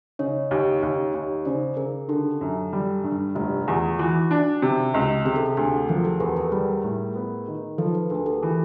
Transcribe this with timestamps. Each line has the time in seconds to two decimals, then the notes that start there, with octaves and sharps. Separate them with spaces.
0.19 C#3 C#5 D#5
0.51 D#2
0.83 D#2
1.14 D#2
1.45 C#3 C5 D5
1.77 C#3 G#4 A#4
2.08 D3 G4 A4
2.41 F#2
2.73 G3
3.04 G2
3.35 F1 G4
3.68 E2 F4
3.99 E3 F#4
4.31 D4
4.62 C3
4.94 C#2
5.25 C3 G#4
5.36 A4
5.46 G#4
5.57 D2 G4 A4
5.89 F3 G#4 A#4
6.05 G4 A4
6.20 E2 A4 B4
6.36 G#4 A#4
6.52 G3 G#4 A#4
6.84 A2
7.15 B3
7.48 D#3
7.78 F3 A4 B4
7.95 A4 B4
8.10 D2 G#4 A#4
8.26 G4 A4
8.43 E3